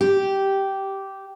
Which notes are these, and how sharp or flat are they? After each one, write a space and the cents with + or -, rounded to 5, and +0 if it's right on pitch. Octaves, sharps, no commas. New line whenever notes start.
G4 -10